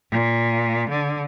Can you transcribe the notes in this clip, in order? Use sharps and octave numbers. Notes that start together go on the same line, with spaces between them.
A#2
D3